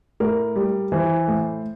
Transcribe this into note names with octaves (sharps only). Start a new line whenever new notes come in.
A2 A#4
G3
E3 C5
A2